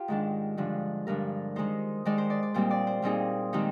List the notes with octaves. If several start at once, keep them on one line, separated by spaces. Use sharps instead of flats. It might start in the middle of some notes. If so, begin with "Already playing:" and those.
Already playing: F4 G4
G#2 D#3 G#3 D4
G2 D3 F3 G#3
G2 D3 F3 G#3 A#4
D#3 G#3 D#4 C5
D#3 G#3 D#4 D5
C5
D5
D5
A#2 G3 C4 D#4 C5
D5
C5
A#2 G3 C4 D#4 G#4
D#3 G#3 C4 D#4 G4